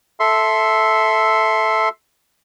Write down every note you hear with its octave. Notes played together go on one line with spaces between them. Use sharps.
A4 E5 C6